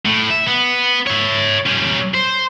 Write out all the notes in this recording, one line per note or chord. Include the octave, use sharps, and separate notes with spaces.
A2
E5
B3
C#5 E5
G3 C#4
C5